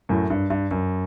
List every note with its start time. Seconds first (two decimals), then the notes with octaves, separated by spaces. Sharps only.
0.09 F#2 A2
0.30 G2
0.50 G2
0.71 F#2